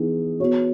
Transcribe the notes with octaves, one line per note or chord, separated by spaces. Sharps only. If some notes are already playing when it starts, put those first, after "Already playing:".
Already playing: E3 B3 D#4 G#4
B3 F#4 C#5